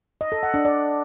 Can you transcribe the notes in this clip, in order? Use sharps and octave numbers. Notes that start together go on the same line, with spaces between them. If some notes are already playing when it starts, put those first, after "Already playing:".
D#5
A4
F#5
D4
D5